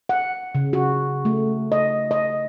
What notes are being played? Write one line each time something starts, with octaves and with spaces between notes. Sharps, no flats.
F#5
C#3
F#4
A3
D#5
D#5